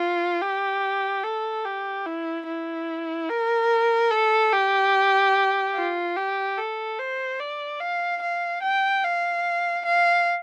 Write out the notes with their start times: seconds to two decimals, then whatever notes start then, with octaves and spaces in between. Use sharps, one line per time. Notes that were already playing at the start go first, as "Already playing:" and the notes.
Already playing: F4
0.42 G4
1.24 A4
1.65 G4
2.06 E4
2.47 E4
3.30 A#4
4.11 A4
4.53 G4
5.75 F4
6.16 G4
6.58 A4
6.99 C5
7.40 D5
7.80 F5
8.22 F5
8.62 G5
9.04 F5
9.85 F5